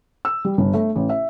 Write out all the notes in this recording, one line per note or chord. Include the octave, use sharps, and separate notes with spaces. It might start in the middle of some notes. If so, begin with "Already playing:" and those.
E6
G3
G1
A3
A1
E5